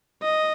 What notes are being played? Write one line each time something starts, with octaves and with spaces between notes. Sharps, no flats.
D#5